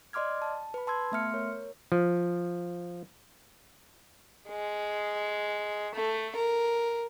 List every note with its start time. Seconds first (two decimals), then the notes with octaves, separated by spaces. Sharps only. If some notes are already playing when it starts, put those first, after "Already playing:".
0.13 D5 D#5 C6 D6 F6 G#6
0.42 A5
0.74 B4 B5
0.87 A5 C6 E6 G#6
1.12 A3 B3 E5 C6 F6 C#7
1.34 A#4 C#5
1.92 F3
4.49 G#3
5.94 A3
6.36 A#4